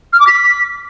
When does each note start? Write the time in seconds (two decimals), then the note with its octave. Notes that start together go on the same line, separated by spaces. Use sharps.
0.13 F6
0.20 D6
0.27 B6